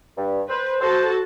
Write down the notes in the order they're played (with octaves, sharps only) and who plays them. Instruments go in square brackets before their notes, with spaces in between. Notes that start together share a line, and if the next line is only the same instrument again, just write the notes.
[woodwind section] G2
[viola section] B4 [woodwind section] C5
[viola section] F#4 A4 A5 [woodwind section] C5